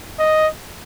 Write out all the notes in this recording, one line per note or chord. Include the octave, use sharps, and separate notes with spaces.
D#5